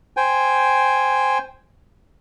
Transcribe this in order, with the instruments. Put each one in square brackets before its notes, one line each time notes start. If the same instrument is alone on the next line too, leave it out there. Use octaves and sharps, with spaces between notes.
[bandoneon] C5 G5 G#5